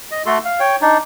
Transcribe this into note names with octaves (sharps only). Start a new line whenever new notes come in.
D#5
A3 F#4 A4 C6
F5
C#5 G5
D4 D#4